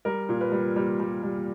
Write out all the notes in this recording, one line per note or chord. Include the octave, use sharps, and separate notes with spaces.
G3 A#4
A#2
B4
G3
G3
G3
G3